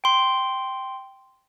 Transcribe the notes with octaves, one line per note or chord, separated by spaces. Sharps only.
G5 C6